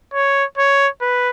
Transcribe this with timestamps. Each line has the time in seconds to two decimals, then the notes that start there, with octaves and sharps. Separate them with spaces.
0.14 C#5
0.58 C#5
1.01 B4